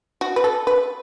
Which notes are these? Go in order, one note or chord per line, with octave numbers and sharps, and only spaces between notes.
F#4
B4
A4
B4